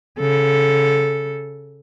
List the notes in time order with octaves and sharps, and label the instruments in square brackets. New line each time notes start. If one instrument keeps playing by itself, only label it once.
[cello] C#3 A4